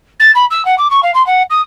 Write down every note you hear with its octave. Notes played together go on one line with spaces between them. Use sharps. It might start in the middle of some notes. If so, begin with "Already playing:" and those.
A6
B5
E6
F#5
D6
C#6
F5
C6
F#5
D#6